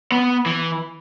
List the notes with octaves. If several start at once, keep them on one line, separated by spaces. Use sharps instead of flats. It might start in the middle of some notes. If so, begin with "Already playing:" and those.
B3
E3